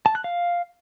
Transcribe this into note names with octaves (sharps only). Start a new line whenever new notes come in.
A5
F#6
F5